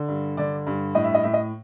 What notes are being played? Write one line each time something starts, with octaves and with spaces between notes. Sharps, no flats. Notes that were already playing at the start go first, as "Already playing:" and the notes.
Already playing: D3
G2
D3 D5
G2
A2 D#5
E5
D#5
A2 E5
D#5